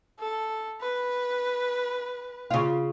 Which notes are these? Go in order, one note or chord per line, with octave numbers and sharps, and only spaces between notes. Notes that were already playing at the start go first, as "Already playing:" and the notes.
A4
B4
C#3 F4